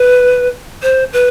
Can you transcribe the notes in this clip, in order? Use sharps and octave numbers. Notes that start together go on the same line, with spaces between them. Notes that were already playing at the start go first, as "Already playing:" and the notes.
Already playing: B4
C5
B4